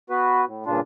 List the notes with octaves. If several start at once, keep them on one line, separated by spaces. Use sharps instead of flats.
B3 F#4 B4
A2
G2 A#2 C#3 D4 F4